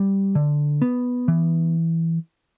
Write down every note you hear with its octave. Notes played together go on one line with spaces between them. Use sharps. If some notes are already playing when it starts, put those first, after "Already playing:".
Already playing: G3
D3
B3
E3